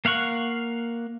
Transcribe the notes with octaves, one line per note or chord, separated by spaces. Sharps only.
A#3 F5 F#5 C#6 F#6